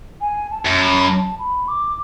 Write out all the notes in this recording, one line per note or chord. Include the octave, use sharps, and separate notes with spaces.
G#5
A5
F#2
B5
A5
B5
D6